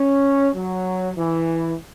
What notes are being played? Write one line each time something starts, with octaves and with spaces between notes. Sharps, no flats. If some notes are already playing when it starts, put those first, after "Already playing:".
Already playing: C#4
F#3
E3